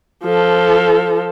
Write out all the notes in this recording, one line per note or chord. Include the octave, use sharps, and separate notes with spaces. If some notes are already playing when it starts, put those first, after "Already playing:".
F3 A4